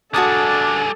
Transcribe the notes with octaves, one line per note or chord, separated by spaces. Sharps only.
G3 D4 F#4 G#4 A4 A5 D#6